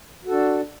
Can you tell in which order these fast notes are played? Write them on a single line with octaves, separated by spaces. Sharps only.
F#4 A4 D4